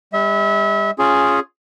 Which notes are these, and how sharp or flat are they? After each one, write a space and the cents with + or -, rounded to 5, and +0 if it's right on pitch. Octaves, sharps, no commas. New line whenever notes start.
G3 +35 E5 -30
C#4 +0 F4 +0 G#4 +0